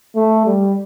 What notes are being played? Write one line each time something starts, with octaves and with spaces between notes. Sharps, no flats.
A3
G3